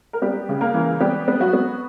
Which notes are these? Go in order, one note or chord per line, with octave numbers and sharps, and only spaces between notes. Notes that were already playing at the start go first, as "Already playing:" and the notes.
A#4
G3 B3 G4
C#3
A#3 A#4
E3
G3 B3 G4
B3
F#3 F#4
B3